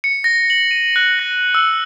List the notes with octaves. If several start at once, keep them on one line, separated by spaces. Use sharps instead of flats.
C#7
A#6
F#7
D#7
F#6
A#6
E6